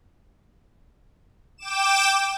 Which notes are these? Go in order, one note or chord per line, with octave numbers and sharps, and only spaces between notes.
G5 D6 E7